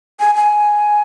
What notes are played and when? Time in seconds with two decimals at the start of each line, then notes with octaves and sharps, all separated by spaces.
0.20 G#5
0.35 G#5